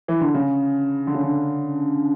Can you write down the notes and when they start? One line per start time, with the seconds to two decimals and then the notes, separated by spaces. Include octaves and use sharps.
0.08 E3
0.21 D3
0.35 C#3
1.07 D3
1.15 C#3
1.23 D3